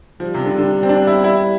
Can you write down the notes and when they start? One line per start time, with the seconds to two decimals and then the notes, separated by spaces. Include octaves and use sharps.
0.19 F3 G3
0.35 C3
0.45 D3
0.58 D3
0.83 C4
0.89 D4
1.07 E4
1.24 E4